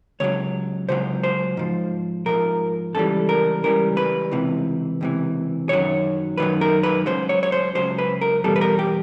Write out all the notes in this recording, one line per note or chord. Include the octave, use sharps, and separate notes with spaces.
C#2 C#3 F#3 C#5
C#2 C#3 F#3 C5
C5
G#2 F3
G#2 F3 A#4
C#2 C#3 E3 G3 A4
A#4
C#2 C#3 E3 G3 A#4
B4
C#2 C3 E3
C#2 C3 E3
F#2 D#3 F#3 C#5
F#2 D#3 F#3 B4
A#4
B4
C#2 C#3 F#3 C5
C#5
C#5
C5
C#2 C#3 F#3 C5
B4
A#4
E2 B2 G3 A4
B4
A#4
G4